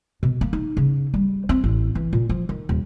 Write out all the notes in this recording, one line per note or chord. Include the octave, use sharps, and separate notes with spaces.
B2
A#3
D#4
C#3
G3
C4
A1
E3
A#2
F3
D#3
D#1